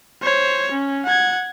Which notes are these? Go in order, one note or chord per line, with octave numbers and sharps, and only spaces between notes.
C5 C#5
C#4
F#5 G#6